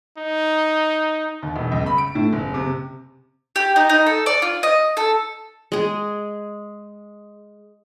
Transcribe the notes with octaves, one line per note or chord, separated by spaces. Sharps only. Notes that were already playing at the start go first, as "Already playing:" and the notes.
D#4
D#2
E1
C#2
B5
D7
A2
F#1
C3
G4
D#4
D#4
A4
D5
F4
D#5
A4
G#3 G#4